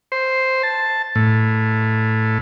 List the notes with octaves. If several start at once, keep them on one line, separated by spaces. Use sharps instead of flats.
C5
A5
A2